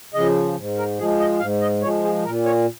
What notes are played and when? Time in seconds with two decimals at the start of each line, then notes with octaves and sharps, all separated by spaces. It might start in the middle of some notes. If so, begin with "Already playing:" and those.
0.14 C#3 F3 D#5
0.57 G#2
0.78 A#4
0.98 F3 G#4
1.01 G#3
1.20 D#5
1.40 G#2 F5
1.61 D#5
1.82 F3 G#3 C#5
2.04 G#4
2.24 A#2 A#4
2.45 C#5